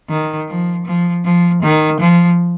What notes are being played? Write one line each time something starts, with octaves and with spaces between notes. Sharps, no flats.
D#3
F3
F3
F3
D#3
F3